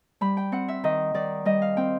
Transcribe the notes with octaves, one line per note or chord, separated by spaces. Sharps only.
G3 B5
G5
C4 F#5
E5
D#3 D#5
D#3 D5
G3 D#5
F5
C4 G5